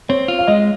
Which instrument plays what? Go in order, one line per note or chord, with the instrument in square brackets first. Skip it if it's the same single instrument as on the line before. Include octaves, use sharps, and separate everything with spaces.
[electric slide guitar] C4 [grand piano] C#5
[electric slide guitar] F4
[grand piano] F5
[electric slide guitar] G#3 [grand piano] D#5